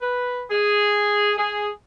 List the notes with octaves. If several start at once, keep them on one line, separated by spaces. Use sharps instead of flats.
B4
G#4
G#4